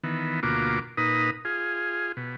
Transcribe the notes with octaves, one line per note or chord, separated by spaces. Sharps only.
D#3 E3 B3
D2 B2 A#3 F4 F#4 D6
A#2 D#4 B4 D#6
F4 G#4
B2